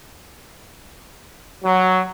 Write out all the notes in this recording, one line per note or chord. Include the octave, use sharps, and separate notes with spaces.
F#3